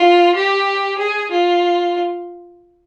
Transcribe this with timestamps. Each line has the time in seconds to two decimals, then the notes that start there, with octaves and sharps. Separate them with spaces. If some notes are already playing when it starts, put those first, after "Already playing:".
Already playing: F4
0.35 G4
0.98 G#4
1.31 F4